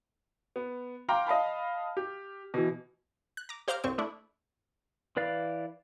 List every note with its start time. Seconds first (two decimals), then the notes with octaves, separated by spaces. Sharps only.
0.56 B3
1.09 F5 G5 A#5 C6 D6 F6
1.27 D#5 F5 A5 B5
1.97 G4
2.54 B2 E3
3.37 F#6
3.49 A#5 D6
3.68 G4 C5 F5 A#5 D6 F6
3.84 C2 G2 C4 C#6
3.98 A3 D4 E4
5.17 E3 B4 D5 F5